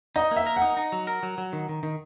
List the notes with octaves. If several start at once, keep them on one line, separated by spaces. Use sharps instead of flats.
D#4 D#5
A#3
E5
A#4
F#5
D#4
D#4
F#3
A#4
F#3
F#3
D#3
D#3
D#3